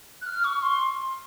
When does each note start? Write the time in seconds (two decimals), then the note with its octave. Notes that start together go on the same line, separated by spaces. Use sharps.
0.21 F#6
0.26 F6
0.44 C#6
0.62 C6